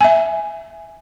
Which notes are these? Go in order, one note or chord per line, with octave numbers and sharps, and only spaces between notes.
E5 G#5